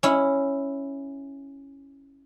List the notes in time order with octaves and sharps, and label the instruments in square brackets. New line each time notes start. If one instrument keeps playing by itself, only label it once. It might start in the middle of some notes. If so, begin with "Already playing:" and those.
[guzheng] C#4 E4